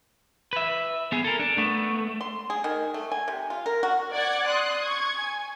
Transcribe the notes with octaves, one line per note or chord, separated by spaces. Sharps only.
B4 E5
B3 G#4
A4 A#4
D4
A3 B3
C6
G#4
D#3
A3
G#5
C3
F4
A#4
F#4
D5 F#5 D6 G#6
C6 D#6 F#6
C#6 G#6
G#5